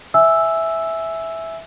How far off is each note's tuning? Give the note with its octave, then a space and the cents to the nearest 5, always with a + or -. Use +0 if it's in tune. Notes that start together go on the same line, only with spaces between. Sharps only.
E5 -5 G#5 +0 E6 +0